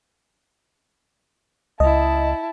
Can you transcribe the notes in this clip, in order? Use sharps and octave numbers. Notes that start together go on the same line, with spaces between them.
C#2 E4 D#5 A5